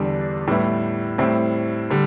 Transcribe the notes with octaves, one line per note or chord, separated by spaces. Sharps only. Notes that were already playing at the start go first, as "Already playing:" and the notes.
Already playing: E2 D3 G3 D4
A2 G3 B3 E4
A2 G3 C4 E4
D3 G3